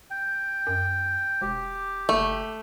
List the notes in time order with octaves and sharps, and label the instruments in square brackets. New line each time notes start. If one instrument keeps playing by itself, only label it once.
[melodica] G5
[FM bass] F#2
[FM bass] E1 [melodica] G4
[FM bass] F#1 [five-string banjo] A3